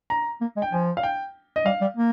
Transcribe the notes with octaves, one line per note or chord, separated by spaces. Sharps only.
A#5
A#3
G#3
G5
F3 G#5
F5
G5
D#5
G3 F5
G3
A#3